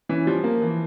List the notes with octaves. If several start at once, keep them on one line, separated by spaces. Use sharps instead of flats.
E3 C#4
F3 G3
A#3
E3